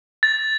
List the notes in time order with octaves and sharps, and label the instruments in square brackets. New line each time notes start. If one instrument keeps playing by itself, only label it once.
[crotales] A6